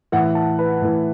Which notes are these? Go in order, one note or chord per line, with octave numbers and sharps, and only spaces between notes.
A2 E3 F#5
A5
B4
A2 E3